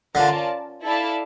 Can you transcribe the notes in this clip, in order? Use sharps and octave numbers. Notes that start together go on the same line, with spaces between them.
D3 C#4 F4 A#4 D5 A5
E4 A4 D5 F5 A5